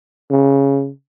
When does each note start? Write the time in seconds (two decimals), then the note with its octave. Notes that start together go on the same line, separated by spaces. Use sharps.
0.30 C#3